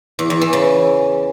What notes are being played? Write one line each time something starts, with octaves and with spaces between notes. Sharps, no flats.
E2
E2
E3
C#3